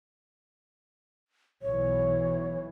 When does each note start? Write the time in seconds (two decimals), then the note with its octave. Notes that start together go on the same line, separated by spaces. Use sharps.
1.62 B1 B2 E3 C#5